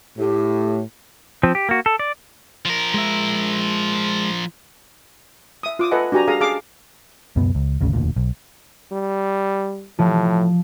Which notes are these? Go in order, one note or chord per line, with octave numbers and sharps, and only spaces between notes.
A2 G4
F3 C4
G4
A#3 F#4
A4
D5
F3 A#4
G#3 E5
E5 D#6
F4 D6 D#6
A4 B4 D#5 F#5 G#5
D4 F#4 G4 G#5 A#5
G#4 A4 F5 A#5 D#6
G#4 F5 A5 D6
C#2 F#2 B2 B3
C#2
G#1 D2 C#3
E1 D2 A#2
B1
G3
A2 F3